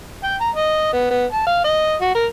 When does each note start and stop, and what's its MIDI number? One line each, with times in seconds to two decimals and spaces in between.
0.24 0.36 79
0.41 0.50 82
0.55 0.92 75
0.93 1.10 59
1.10 1.25 59
1.33 1.45 81
1.47 1.60 77
1.64 1.94 75
2.02 2.13 66
2.15 2.26 70